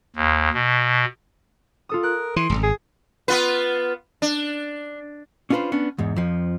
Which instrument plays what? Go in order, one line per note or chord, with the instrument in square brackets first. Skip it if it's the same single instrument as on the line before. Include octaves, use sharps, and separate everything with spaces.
[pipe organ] D#2
B2
[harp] F4 A4 D#6
[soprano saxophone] A#4 [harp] F#6
[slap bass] E3 [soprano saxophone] C6
[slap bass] D1 G#1
[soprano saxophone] G#4
[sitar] B3 F4 B4
D4
[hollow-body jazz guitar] C#4 D4 F4 A4 B4 C5
B3 C#4 D4
E2 G#2
F2 F3